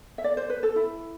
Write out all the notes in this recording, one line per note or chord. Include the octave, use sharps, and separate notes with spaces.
E5
D5
C5
B4
A4
E4